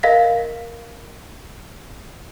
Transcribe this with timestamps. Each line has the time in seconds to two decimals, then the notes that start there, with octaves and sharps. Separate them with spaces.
0.03 A#4 D#5 F5 A#6 B6